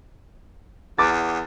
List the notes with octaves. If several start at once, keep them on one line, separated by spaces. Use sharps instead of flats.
E2 D6 A6